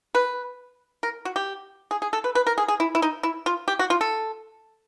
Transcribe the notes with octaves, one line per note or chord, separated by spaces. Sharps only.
B4
A#4
F#4
G4
G#4
G#4
A4
B4
B4
A#4
G#4
G#4
E4
E4
D#4
E4
F4
G4
F#4
F4
A4